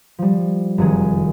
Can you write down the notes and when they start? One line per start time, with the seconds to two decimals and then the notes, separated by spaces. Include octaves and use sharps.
0.19 F3 G3
0.78 F1 F#2 D#3 G#4